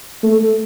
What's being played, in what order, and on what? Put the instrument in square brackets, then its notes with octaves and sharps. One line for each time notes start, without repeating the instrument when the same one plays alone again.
[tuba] A3